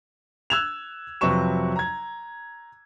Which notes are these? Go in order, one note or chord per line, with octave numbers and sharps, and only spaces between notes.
E6 F#6 G#6 E7 F7
F2 C3 F#3 B4 C#6 E7
A#5 G#6